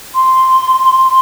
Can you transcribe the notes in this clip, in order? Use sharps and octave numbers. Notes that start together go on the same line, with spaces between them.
C6